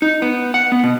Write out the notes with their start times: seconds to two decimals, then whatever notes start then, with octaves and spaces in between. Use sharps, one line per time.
0.02 D#4
0.22 B3
0.54 F#5
0.72 B3
0.84 B2